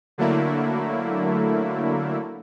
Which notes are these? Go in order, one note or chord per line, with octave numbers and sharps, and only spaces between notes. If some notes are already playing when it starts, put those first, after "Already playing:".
D3 F#3 A3 A#3 E4